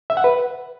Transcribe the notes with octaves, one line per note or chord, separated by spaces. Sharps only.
E5
F#5
B4